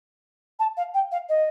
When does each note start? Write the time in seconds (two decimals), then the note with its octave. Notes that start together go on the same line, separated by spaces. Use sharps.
0.59 A5
0.77 F5
0.94 G5
1.12 F5
1.29 D#5